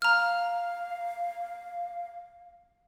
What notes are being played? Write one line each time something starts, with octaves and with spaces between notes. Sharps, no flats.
F5 A#5 F6